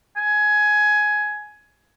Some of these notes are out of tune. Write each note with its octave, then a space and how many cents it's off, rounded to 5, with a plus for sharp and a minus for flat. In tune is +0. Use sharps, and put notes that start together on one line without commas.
G#5 +15